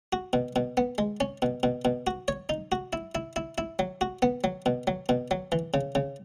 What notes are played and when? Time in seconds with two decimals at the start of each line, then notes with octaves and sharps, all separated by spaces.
0.13 F#4
0.33 B2
0.56 B2
0.77 B3
0.98 G#3
1.20 C#4
1.42 B2
1.63 B2
1.85 B2
2.07 F#4
2.28 C#5
2.49 D#4
2.72 F#4
2.93 E4
3.15 E4
3.36 E4
3.58 E4
3.79 F#3
4.01 F#4
4.22 B3
4.44 F#3
4.66 B2
4.87 F#3
5.09 B2
5.31 F#3
5.52 E3
5.74 C#3
5.95 C#3